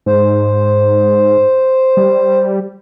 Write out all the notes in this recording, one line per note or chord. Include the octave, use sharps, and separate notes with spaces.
G#2 C5
G3